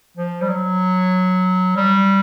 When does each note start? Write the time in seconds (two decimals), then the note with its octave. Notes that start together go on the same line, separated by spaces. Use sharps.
0.17 F3
0.42 G3
0.49 F#3
1.76 G3